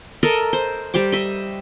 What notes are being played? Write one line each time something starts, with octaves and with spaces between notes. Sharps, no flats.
A4 A#4 D#5
C5
G3 C5 G5 D6
D#5 E5